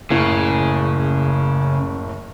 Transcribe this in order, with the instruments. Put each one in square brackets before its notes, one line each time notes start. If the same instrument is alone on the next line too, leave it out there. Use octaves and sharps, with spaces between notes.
[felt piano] F#1 A2 [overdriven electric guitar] C#3